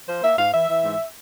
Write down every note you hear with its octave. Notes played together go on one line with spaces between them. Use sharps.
F3 C5
A#3 E5
G#2 F5
E3 E5
E3
G#2